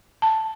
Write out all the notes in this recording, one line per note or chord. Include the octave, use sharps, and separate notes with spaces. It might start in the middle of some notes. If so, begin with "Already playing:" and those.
A5